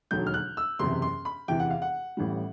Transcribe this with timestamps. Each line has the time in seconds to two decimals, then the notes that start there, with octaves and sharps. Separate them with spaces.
0.11 E1 D#2 D3 F#3 G6
0.27 F6
0.34 F#6
0.57 E6
0.79 F#1 E2 C3 C6
1.02 C6
1.25 B5
1.48 E2 C3 E3 G5
1.60 F#5
1.70 F5
1.82 F#5
2.17 A1 A2 E3 G3